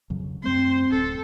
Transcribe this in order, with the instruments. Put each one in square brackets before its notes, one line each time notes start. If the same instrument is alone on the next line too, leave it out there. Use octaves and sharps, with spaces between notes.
[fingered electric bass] F2 C#3 F#3
[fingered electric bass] F#2 G3 A3 [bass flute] C4 [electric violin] C5 C6
[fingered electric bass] D1 [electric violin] A4